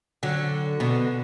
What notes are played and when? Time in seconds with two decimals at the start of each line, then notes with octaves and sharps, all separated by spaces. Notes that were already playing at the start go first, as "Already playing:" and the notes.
0.23 D3 F#3
0.80 B2 D3